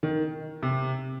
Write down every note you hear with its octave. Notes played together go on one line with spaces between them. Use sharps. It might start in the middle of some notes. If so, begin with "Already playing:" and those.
D#3
C3